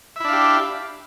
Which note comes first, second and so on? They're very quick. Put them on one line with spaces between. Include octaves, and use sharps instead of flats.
E5 E4 D4 F5 G4